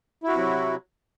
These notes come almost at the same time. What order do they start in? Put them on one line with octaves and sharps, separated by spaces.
E4 F#4 C3 F#3